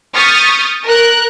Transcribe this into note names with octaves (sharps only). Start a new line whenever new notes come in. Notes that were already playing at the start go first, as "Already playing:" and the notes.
C#6 D#6 F6 G6 A6 B6
A#4 F#6